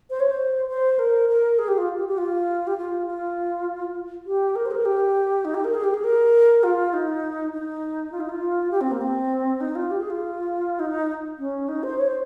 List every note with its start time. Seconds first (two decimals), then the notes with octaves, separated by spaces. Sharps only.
0.10 C5
0.20 C#5
0.30 C5
0.69 C5
0.99 A#4
1.29 A#4
1.59 G#4
1.68 G4
1.78 F4
1.98 G4
2.09 G4
2.18 F4
2.67 G4
2.78 F4
3.07 F4
4.26 G4
4.56 A#4
4.65 C5
4.71 G#4
4.75 A#4
4.85 G4
5.45 D#4
5.54 G4
5.64 A#4
5.74 G#4
5.84 G4
5.94 G#4
6.04 A#4
6.63 F4
6.93 D#4
7.53 D#4
8.12 F4
8.21 D#4
8.29 F4
8.71 G4
8.81 C4
8.91 A#3
9.01 C4
9.61 D#4
9.75 F4
9.91 G4
10.00 G#4
10.10 F4
10.80 D#4
11.39 C#4
11.69 D#4
11.83 C5
11.98 C#5
12.07 C5